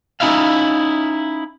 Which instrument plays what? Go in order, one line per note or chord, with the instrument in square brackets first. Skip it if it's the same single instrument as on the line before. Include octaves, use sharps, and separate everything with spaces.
[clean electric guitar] C#4 D#4 E4 E5 F5